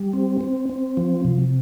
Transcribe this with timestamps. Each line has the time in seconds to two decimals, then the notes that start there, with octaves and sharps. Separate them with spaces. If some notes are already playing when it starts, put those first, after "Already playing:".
Already playing: G3
0.13 C4
0.41 C4
0.69 C4
0.97 F3
1.25 C3